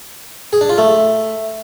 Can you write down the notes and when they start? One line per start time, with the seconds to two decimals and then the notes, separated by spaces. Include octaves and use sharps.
0.53 G#4
0.61 D4
0.69 F4
0.78 A3